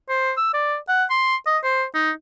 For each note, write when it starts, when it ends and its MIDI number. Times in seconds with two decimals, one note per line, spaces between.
0.09 0.32 72
0.37 0.50 88
0.54 0.76 74
0.89 1.04 78
1.10 1.36 84
1.46 1.58 75
1.64 1.85 72
1.95 2.11 63